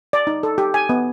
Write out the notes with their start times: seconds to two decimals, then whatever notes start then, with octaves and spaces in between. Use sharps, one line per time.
0.13 D5
0.27 D#4
0.43 A4
0.58 G4
0.74 G#5
0.89 B3